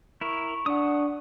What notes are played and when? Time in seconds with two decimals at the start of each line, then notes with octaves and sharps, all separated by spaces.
0.21 E4 A#4 C#6
0.66 D4 F#5 D#6